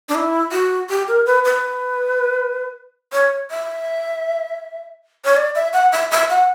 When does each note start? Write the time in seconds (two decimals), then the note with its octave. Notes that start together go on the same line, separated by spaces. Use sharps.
0.09 D4
0.15 E4
0.52 F#4
0.90 G4
1.08 A#4
1.26 B4
1.45 B4
3.13 C#5
3.51 E5
5.25 C#5
5.37 D5
5.55 E5
5.73 F#5
5.92 E5
6.11 E5
6.30 F#5